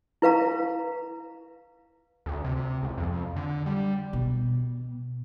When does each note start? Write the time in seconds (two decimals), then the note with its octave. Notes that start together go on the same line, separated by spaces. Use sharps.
0.22 E4 B4 F5 A#5
2.26 D2
2.45 C3
2.83 C#2
2.98 F2
3.36 D3
3.66 G3
4.13 B2